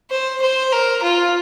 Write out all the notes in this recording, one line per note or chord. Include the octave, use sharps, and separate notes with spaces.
C5
C5
A#4
F4